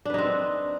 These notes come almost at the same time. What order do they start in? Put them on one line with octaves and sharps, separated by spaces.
D4 B4 D#4 C4